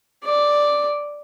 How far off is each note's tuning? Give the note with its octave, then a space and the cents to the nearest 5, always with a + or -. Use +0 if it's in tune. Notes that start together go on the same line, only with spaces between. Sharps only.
D5 +0